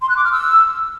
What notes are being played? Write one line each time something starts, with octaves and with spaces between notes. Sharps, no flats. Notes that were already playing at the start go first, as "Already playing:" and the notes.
C6
F#6
D6
F6
E6